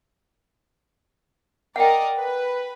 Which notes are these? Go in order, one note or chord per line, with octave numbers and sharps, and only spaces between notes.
A#4 D5 D#5 F#5 G5
B4